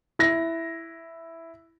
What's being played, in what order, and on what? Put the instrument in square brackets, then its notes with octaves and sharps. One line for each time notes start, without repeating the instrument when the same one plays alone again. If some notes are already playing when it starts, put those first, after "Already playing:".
[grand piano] E4 A#6